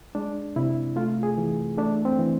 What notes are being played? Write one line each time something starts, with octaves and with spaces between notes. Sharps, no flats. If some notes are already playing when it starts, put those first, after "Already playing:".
G#3 D4
C3 E4
A3 F4
G#4
E3
A3 D4
C4
E3